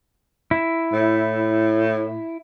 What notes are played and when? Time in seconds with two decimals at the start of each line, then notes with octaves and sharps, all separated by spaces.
0.51 E4
0.92 A2